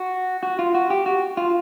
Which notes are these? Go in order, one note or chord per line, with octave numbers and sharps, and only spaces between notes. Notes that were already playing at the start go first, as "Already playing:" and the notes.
Already playing: F#4
F#4
F4
F#4
G4
F#4
F4